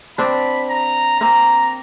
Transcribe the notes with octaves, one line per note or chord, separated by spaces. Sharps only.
C4 D4 B5
A#5
A#3 C4 A#5